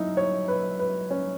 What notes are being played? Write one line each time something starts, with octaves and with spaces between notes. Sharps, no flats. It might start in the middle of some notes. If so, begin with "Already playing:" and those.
Already playing: F#2 D#4 E4
C#5
B4
B4
C#4